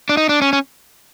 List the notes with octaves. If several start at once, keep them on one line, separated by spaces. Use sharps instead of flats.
D4
D#4
D4
C#4
C#4